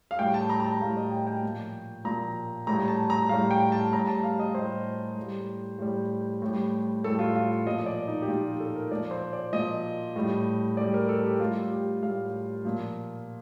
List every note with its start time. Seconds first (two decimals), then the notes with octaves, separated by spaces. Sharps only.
0.11 F5
0.19 A2 G3 G5
0.34 A5
0.50 A#5
0.60 A#5
0.65 A5
0.81 A2 G3 F5
0.97 D#5
1.12 G5
1.27 G5
1.43 A#2 F3
2.05 A#2 F3 A#5
2.67 A2 G3 A#5
2.88 A5
3.10 A#5
3.29 A2 G3 F5
3.51 G5
3.72 A5
3.92 A2 G3 A#5
4.07 A5
4.23 F5
4.39 D#5
4.54 A2 G3 C5
5.16 A2
5.22 G3
5.79 A2 G3
6.42 A2 G3
7.04 A2 G3 A4
7.19 F4
7.35 F4
7.66 A#2 F3 D#5
7.86 D5
8.07 D#4
8.22 G4
8.28 A#2 F3 F4
8.45 G4
8.60 A4
8.76 A#4
8.91 A#2 F3 D5
9.11 C5
9.33 D5
9.53 A#2 F3 D#5
10.16 A2 G3
10.77 A2 G3 D5
10.94 A#4
11.09 A4
11.25 G4
11.40 A2 G3 F4
11.71 G4
12.03 A2 G3 F5
12.65 A#2 F3